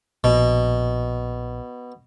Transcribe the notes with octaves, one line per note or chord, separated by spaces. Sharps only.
A#1 B2